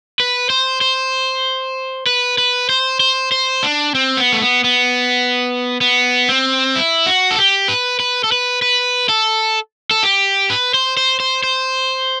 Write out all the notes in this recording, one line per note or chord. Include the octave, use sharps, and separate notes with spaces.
B4
C5
C5
B4
B4
C5
C5
C5
D4
C4
B3
A3
B3
B3
B3
C4
E4
F#4
A4
G4
B4
B4
A4
B4
B4
A4
A4
G4
B4
C5
C5
C5
C5